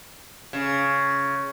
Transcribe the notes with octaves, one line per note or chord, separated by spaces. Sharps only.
C#3